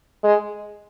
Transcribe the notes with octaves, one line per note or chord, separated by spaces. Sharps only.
G#3